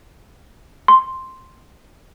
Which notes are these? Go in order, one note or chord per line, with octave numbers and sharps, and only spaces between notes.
C6